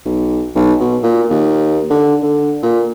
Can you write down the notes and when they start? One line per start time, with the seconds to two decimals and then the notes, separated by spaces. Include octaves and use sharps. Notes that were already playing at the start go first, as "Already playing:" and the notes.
0.05 B1
0.56 B1
0.80 B2
1.03 A#2
1.30 D#2
1.90 D3
2.23 D3
2.63 A#2